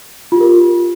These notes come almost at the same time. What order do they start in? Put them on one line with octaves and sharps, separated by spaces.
F4 G4 A#4